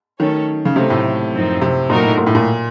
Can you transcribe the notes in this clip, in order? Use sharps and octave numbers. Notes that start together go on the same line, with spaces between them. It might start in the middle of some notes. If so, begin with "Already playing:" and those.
D#3 F#3 A3 C#4 A4 C#5
C#3
C3 F#3 A3 D#4
A2
F#2 F3 C4 D#4
C3
A#2 F#3 A3 D#4 F#4 A#4
A2
A#2
A2
A#2